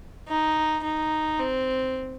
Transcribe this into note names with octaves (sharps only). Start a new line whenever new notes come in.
D#4
D#4
C4